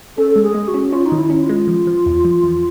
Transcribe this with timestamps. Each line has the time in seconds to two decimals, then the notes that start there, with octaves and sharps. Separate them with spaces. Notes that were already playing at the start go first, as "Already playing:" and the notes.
0.17 C#4 A4
0.31 A4
0.36 G#3
0.43 G#4
0.55 G#3
0.68 F#4
0.74 C#4
0.93 C#4 F4
1.06 D#4
1.12 D#3
1.18 E4
1.30 C#4
1.43 F4
1.49 G#3
1.68 F3
1.87 F3
2.06 E2
2.25 F3
2.43 E2